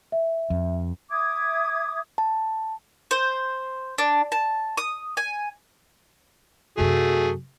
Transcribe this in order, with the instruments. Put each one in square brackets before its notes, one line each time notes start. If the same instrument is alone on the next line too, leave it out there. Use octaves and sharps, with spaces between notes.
[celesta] E5
[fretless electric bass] F2
[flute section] E5 D6 D#6 G#6
[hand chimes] A5
[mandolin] C5
D4
A5
D#6
G#5
[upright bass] F#2 C3 [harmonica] A3 G#4 [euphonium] F#4